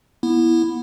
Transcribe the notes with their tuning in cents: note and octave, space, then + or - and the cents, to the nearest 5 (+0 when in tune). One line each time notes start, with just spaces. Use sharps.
B3 -20 E4 +0